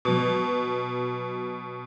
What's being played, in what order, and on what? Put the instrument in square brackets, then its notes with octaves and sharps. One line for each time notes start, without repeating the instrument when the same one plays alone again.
[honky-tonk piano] B2 F#3